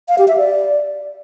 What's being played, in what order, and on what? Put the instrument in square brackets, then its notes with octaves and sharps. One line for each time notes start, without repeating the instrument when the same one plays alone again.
[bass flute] F5
G4
E5
D5